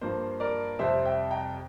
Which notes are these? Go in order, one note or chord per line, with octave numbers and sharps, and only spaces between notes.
G2 F3 A#3 C5
A#4 D5
F2 C3 G3 C5 E5
E5 G5
G5 A#5